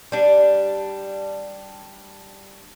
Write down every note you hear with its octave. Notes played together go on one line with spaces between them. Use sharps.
G3 D4